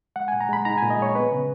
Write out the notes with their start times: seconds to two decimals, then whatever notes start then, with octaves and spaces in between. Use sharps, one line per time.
0.16 G#3 F#5
0.28 A#2 G#5
0.41 A#5
0.49 G#3 B5
0.65 D#4 A#5
0.78 A#2 G#5
0.90 D#5
0.98 G#3 C#5
1.15 B3 B4
1.31 C#3